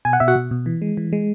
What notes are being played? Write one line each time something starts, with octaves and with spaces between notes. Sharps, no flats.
B2 G#5
F#5
B2 E5
F#4 F#5
B2
B2
E3
G#3
E3
G#3